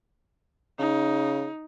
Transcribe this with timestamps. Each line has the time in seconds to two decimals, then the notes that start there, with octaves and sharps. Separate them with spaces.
0.79 C#3 D#4